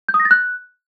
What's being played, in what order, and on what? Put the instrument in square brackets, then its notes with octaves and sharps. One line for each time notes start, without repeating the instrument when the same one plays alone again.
[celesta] G6
D#6
A#6
A6
F#6